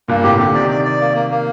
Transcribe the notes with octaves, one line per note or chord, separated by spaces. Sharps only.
G2 A#2 A#3
A2 C3 G4
A#2 D3 G4
C3 D#3 D5
D5
D5
A#3
A#3
A#3